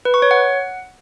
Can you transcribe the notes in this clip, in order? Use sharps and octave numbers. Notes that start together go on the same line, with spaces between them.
B4
C#6
C#5
F#5